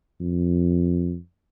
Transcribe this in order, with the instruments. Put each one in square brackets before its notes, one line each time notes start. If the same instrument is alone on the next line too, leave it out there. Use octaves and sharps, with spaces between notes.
[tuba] F2